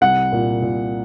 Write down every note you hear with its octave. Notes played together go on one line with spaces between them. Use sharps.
C2 F#5
A#2
A#2